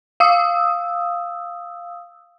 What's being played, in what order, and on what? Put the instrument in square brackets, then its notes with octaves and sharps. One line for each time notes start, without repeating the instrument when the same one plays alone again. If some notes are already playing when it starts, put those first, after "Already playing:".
[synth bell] F5 D#6 E6